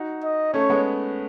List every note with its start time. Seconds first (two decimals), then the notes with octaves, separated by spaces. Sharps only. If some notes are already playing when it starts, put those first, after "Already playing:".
Already playing: D#4 F#4
0.23 D#5
0.53 A3 C#4 C#5
0.70 G#3 B3